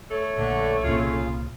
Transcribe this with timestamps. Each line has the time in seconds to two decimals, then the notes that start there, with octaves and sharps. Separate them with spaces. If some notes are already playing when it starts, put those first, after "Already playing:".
0.11 A3 C#5
0.37 A#1 D3
0.83 C2 A#2 C#3 F4